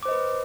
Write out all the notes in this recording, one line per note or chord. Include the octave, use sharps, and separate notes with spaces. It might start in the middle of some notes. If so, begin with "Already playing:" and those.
B4 C5 D#5 D6